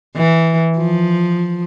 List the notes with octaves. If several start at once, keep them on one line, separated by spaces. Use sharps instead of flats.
E3
F3